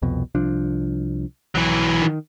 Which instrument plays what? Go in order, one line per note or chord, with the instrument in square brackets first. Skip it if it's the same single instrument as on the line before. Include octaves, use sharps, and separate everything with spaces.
[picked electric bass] C2 F2 B2
C2 F3 D4
[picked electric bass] B1 [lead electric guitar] E3 F#3
[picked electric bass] D#3